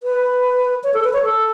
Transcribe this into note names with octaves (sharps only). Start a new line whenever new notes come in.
B4
C#5
A4
B4
C#5
A4